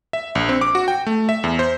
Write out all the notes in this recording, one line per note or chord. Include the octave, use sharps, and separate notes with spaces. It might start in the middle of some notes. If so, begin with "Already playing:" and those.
E5
A#1
C4
D6
F#4
G5
A3
E5
E2
C5